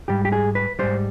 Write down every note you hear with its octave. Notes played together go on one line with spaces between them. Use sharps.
G#2 G3 G4
G4
G#4
B4
G#2 G3 C5